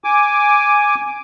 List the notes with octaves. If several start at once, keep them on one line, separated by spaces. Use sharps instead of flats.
G#5 D6